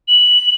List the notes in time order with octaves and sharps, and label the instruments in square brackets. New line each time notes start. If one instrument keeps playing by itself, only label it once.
[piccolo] F#7